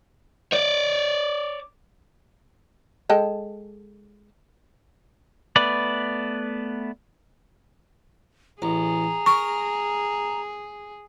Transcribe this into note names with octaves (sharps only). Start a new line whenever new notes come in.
C#5 D5
G#3 A4 G5
A3 B3 B4 D5
A1 G#4 A#5
A#4 C#6